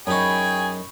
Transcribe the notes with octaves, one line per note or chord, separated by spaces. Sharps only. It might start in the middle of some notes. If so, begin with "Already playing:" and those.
F#2 D#4 G#4 G5 G#5 B5 C#6